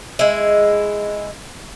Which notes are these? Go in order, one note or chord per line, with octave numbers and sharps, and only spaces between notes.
G#3 E4